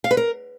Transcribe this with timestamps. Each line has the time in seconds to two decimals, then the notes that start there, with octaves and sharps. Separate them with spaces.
0.04 F5
0.11 B4
0.17 A#4